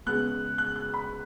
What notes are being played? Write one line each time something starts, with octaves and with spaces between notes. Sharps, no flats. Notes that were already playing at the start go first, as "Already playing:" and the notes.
C#3 G#3 B3 F#6
F#6
F#6
B5